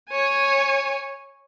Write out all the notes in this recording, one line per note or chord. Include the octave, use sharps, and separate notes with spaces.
C#5 G#5